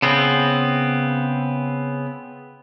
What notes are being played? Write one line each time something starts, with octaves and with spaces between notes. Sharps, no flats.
C#3 B3 C4